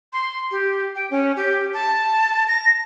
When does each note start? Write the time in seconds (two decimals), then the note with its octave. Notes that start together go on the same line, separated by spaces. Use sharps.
0.13 C6
0.51 G4
0.96 G5
1.11 C#4
1.36 G4
1.74 A5
2.48 A#6